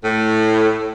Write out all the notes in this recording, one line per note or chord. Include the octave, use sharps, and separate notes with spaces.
A2